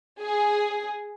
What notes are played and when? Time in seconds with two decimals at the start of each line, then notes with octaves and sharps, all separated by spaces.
0.19 G#4